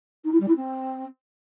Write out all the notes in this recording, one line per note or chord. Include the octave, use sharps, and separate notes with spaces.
D#4
E4
G3
E4
C4